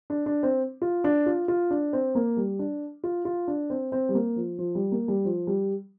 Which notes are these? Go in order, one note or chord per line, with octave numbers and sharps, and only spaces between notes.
D4
D4
C4
F4
D4
F4
F4
D4
C4
A#3
G3
D4
F4
F4
D4
C4
C4
G3
A#3
F3
F3
G3
A#3
G3
F3
G3